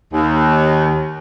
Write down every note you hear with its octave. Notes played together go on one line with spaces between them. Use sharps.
D#2